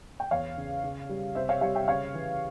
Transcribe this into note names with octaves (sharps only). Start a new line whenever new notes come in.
G5
E2 C#5 F5
C#3
C#3
G3
C3 C5 E5
C#5 F5
G3 C#5 F5
E5 G5
C#3 C#5 F5
E3